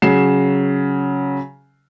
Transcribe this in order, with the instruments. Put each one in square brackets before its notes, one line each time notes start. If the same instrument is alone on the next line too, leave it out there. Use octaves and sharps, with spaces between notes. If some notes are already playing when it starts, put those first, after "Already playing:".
[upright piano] C#3 F#3 C7 E7